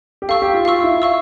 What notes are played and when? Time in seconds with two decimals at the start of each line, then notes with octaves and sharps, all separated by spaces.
0.22 G4
0.29 A4 F5 C#6 E6
0.42 G4
0.54 F4
0.65 F4 F5 C#6 E6
0.83 E4
1.02 F5 C#6 E6